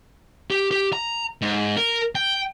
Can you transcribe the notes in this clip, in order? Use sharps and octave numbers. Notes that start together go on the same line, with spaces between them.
G4
G4
A#5
G#2
A#4
G5